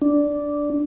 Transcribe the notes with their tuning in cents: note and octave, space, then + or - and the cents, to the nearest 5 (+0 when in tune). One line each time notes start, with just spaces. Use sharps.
D4 -5